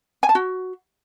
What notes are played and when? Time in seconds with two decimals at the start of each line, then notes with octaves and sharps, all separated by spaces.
0.23 G#5
0.29 A5
0.35 F#4